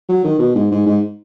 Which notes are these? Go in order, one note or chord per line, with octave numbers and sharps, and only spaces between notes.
F#3
D#3
B2
G#2
G#2
G#2